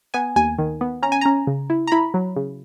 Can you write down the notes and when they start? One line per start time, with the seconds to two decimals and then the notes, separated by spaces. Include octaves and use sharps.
0.14 B3 G#5
0.36 D#2 G#5
0.59 D#3
0.81 B3
1.03 C#4 A#5
1.12 G#5
1.21 C#4 A#5
1.47 C#3
1.70 E4
1.87 A#5
1.92 E4 B5
2.14 F#3
2.36 C#3